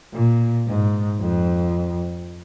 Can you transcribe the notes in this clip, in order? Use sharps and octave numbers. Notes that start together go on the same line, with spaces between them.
A#2
G#2
F2